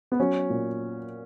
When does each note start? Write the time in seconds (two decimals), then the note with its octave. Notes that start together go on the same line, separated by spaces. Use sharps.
0.12 B3
0.20 F#3 C#4
0.50 A#2